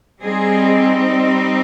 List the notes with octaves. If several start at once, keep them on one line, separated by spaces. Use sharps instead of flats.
G3 C4 D#4 G#4